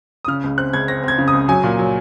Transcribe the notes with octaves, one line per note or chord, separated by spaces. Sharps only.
D#6
C#3 F6
C#2
C4 F#6
C#2 G#6
C4 A#6
C4 G#6
C#3
D#6
C#2
F#3 G#5
A#2
F#3